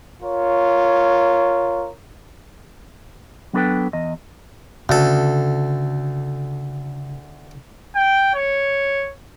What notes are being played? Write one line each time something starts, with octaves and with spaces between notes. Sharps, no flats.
F4 A#4 C#5
F#3 B3 D4 A4 B4 G5
E2 D#5
D2 C#3 A4
G5
C#5